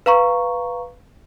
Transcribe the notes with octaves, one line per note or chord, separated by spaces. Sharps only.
B4 F5 A#5 C#6